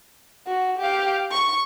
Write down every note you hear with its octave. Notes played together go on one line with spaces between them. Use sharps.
F#4
G4 F5
C#6